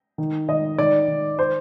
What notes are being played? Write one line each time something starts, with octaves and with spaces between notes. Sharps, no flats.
D#3
D#3 D#5
D#3 D5
D#3
C5